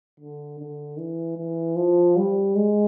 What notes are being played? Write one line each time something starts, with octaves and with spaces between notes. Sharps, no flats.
D3
D3
E3
E3
F3
G3
G#3